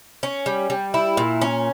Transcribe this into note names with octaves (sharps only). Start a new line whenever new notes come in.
C#4
G3
G3
E4
A#2
C#4